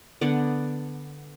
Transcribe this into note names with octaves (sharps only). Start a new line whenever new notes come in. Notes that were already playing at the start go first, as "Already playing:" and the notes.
D3 B3 D5 F#5